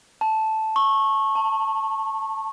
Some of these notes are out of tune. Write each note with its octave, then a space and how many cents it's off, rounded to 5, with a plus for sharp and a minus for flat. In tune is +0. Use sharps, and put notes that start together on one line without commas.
A5 -5
C#6 -20
A5 +20